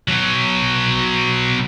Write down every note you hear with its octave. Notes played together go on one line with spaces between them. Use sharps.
B2 F#3